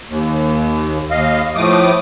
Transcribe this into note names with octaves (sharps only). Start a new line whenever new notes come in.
D#2
D#2 D#5 F5
A2 F3 A3 D6 D#6